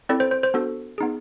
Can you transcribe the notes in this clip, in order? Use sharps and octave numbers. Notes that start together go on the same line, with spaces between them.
C4 E4 A4 D5
C5
C5
C5
B3 D4 F#4 A4
B3 D#4 G#4